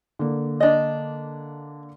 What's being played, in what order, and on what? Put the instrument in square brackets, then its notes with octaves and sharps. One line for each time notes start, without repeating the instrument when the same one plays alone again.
[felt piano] D3 A#3
[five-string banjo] D4 D#5